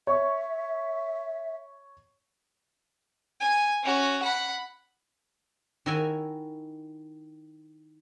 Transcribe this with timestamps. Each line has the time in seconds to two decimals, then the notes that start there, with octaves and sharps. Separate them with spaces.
0.07 C#5 E5 C#6
3.40 G#5
3.83 C#4 F#4
4.23 F#5 B5
5.86 D#3 E4 F#4 A#4 E5 G#5